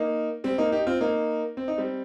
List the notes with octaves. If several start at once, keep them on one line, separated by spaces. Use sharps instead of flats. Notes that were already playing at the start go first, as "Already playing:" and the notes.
Already playing: A#3 D#4
G3 C4
A#3 D#4
D#4 G4
C4 F4
A#3 D#4
C4
D#4
G3 C4